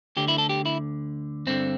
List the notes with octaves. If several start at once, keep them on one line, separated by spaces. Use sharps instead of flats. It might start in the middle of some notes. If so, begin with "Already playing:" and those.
D2 D3 G4
E4
A4
G4
E4
G2 D3 C4